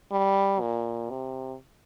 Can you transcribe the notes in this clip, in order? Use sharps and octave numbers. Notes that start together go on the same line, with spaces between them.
G3
A#2
C3